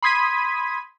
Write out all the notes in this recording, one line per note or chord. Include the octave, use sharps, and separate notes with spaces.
B5 C6 D#6 G#6 B6 D#7